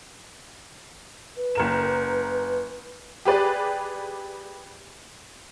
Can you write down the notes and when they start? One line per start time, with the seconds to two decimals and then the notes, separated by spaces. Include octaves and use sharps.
1.37 B4
1.55 F#1 A#4 E7
3.25 G4 G#4 B4 D5